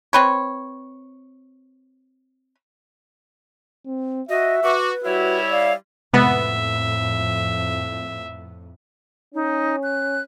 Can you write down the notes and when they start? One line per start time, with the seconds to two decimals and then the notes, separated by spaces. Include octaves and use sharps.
0.13 C4 B4 C#5
3.86 C4
4.29 F#4 D#5 E5
4.64 F#4 B4 D6
5.04 G3 E4 F#4 C#5 E5
5.51 D5 F5
6.14 F2 A2 C3 G#3 B3 E5 A6
9.34 C#4 D#4
9.83 F#6